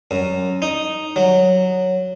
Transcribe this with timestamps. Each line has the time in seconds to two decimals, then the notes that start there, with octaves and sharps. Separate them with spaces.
0.11 F#2
0.62 D#4
1.16 F#3